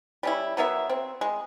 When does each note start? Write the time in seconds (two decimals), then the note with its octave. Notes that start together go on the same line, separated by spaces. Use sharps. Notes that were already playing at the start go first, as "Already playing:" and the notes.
0.23 G3 C#4 E4
0.57 F#3 B3 A#4 E5
0.89 C4
1.21 G#3